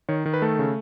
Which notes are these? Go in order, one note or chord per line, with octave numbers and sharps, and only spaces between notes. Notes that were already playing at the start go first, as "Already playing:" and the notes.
D#3 C#5
D#3
B4
A3 A4
C#3